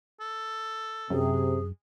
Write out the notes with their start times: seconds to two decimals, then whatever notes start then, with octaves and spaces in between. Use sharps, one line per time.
0.20 A4
1.10 F#2 C3 G#4